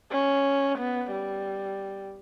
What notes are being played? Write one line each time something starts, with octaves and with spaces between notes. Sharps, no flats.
C#4
B3
G3